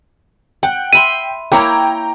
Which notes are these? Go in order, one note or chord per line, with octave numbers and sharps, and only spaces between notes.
F#5 G5
E5 B5 C6 D#7
A#3 E4 C#5 G5 A#5